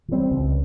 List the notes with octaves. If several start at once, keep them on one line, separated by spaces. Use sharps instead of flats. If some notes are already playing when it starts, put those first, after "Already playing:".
E3 G3 C4
C#2